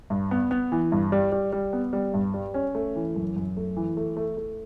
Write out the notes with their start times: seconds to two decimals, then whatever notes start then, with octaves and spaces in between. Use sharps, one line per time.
0.10 G2
0.31 B3
0.51 B3
0.72 E3
0.92 G2
1.12 G3
1.32 G3
1.53 G3
1.73 B3
1.93 G3
2.14 G2
2.34 G3
2.54 C#4
2.75 A3
2.96 E3
3.16 F#2
3.36 F#2
3.57 A3
3.77 E3
3.97 A3
4.17 A3
4.37 A3